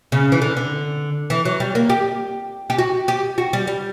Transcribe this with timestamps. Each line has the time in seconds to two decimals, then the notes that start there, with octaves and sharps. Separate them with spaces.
0.12 C#3
0.32 E3
0.42 D3
0.57 D3
1.30 E3
1.45 F#3
1.60 G3
1.75 A#3
1.90 G4
2.70 G4
2.78 F#4
3.08 G4
3.38 F#4
3.53 G3
3.67 G3